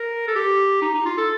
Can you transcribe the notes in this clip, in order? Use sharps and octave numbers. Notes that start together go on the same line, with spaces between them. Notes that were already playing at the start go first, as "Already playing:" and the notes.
Already playing: A#4
A4
G4
D#4
D#4
F4
A4